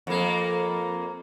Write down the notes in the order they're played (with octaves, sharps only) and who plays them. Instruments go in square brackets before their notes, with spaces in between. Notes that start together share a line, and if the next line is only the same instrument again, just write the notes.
[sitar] F2 A#3